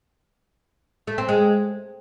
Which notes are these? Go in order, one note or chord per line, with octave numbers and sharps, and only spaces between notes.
A3
C4
G#3